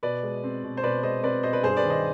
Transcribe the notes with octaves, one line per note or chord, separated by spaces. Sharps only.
B2 B4 D5
G#3
C4
B2
C5
B2 B4 D5
G#3 C5 D#5
C4 B4 D5
B2 C5 D#5
B4 D5
G2 G#4 C5
B4 D5
D#3
C5 D#5